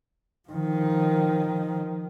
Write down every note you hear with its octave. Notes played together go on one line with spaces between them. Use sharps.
D#3 F3